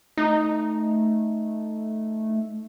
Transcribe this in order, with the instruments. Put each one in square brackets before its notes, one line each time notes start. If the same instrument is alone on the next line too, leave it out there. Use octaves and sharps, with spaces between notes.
[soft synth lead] A3 [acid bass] D#4